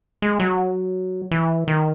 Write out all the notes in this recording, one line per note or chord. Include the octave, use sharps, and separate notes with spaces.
G#3
F#3
E3
D#3